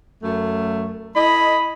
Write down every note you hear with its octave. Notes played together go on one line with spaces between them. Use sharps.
F#2 A3
E4 A4 D#5 B5